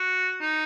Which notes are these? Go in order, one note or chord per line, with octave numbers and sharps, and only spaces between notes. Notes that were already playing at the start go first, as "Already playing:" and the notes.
Already playing: F#4
D#4